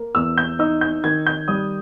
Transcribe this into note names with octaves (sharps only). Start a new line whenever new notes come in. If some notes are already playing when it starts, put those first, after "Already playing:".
Already playing: A#3
E2 E6
G6
D#4 E6
G6
D#3 G#6
G6
G3 D#6